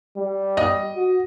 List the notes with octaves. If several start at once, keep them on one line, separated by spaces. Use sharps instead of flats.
G3
D#5
F#4